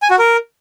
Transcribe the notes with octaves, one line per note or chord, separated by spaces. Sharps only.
G#5
F#4
A#4